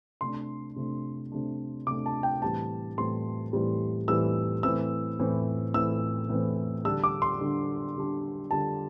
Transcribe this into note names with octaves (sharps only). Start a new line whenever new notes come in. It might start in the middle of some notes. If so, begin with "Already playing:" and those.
C3 A3 D4 C6
C3 A3 D4
C3 A3 D4
C3 A3 D4 D6
A5
G5
A2 E3 G3 C4 A5
A2 E3 G3 C4 C6
A2 E3 G3 C4
A2 E3 G3 C4 E6
A2 E3 C4 E6
A2 E3 C4
A2 E3 C4 E6
A2 E3 C4
D3 G3 D4 E6
D6
C6
D3 G3 D4
D3 G3 D4
D3 G3 D4 A5